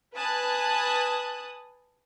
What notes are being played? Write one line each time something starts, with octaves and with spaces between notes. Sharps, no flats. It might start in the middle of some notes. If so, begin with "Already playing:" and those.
B4 G#5 A5 D#6 F#6